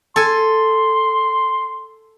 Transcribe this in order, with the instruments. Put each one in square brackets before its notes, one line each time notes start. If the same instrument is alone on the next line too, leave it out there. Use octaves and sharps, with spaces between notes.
[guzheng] A4 G#5 [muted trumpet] C6